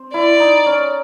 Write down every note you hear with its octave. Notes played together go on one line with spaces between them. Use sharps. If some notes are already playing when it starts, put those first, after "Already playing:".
Already playing: C4
E4 D5
D#4
C#4